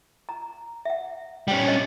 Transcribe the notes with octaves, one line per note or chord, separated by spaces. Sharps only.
A#5
E5 F#5
G3 C#4 C5 G5
D4 D#5